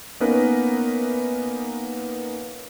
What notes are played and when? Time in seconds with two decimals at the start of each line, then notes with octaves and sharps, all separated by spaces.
0.20 A#3 B3 C#4 D#4 A#4 B4